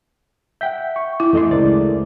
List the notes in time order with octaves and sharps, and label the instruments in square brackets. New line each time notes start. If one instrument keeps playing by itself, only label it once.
[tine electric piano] E5 B6 [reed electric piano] F#5 G5 G6
[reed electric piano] C#6
[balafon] E4
[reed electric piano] F2 D#5 C6 [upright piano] E3 A3
[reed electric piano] D2 C#3 G#3 [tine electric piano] A#4 C5 D5